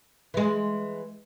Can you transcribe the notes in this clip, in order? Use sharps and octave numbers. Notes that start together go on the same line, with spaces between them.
E3 G#3